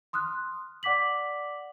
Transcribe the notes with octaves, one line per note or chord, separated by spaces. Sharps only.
C6 D#6 F6 F#6
D5 F#5 D6 B6 F#7